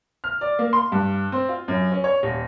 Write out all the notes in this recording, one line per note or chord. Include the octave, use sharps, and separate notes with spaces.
F6
D5
A#3
C6
G2
C4
F4
F#2
C#4
C#5
D#1